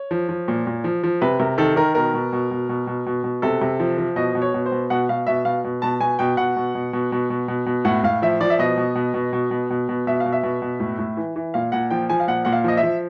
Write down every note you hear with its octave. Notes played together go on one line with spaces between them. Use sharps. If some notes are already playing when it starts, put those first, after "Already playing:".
Already playing: C#5
F3
F3
A#2
A#2
F3
F3
C3 B4
C3 A#4
D#3 A4
D#3 A#4
B2 A#4
B2
B2
B2
B2
B2
B2
B2
C3 A4
C3
F3
F3
B2 D#5
B2
C#5
B2
C5
B2
B2 F#5
B2 F5
B2 E5
B2 F5
B2
B2 A5
B2 G#5
B2 G5
B2 F#5
B2
B2
B2
B2
B2
B2
B2
A2 F#5
A2 F5
F3 E5
F3 D5
E5
B2 D#5
B2
B2
B2
B2
B2
B2
B2
B2 E5
F5
B2
E5
B2
B2
A2
A2
E3
E3
A#2 F5
A#2 F#5
F3 G5
F3 G#5
F5
A#2 F#5
A#2 F#5
F5
F3 D#5
E5
F3